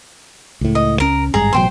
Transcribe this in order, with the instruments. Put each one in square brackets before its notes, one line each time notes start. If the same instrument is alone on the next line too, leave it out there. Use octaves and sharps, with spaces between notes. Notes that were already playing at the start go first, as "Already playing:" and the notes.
[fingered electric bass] C#2 A2
[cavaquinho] D#5
[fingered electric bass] C#2 C#4 [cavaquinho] A#4
[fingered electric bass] G#1 G2 G#3 [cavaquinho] G#4 A#5
[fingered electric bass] A1 B2 F#3 [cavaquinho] C5 G5 C6